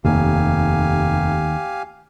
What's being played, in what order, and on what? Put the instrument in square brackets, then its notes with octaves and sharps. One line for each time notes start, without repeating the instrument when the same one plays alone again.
[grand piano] F1 [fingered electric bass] D#2 [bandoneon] G4 F5 G#5